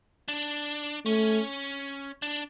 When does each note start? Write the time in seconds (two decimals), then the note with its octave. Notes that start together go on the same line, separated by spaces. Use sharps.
0.28 D4
1.06 A3 C#4
2.22 D4